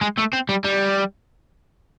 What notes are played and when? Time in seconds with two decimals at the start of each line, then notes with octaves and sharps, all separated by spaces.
0.01 G#3
0.18 A3
0.33 C4
0.49 G3
0.65 G3